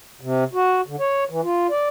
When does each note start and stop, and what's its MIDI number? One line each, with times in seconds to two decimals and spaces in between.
0.21 0.44 48
0.53 0.81 66
0.87 0.96 50
1.00 1.24 73
1.30 1.41 52
1.43 1.67 65
1.70 1.89 74